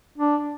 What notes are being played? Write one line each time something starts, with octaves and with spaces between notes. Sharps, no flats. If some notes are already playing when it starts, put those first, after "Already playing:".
D4